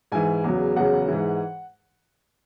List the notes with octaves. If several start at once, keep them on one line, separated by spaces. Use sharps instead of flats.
G#2 E3 G#5
E2 C#3 F#3
E2 C#3 F#3 F#5
G#2 E3